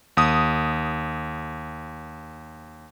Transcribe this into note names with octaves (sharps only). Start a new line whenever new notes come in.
D#2 D#6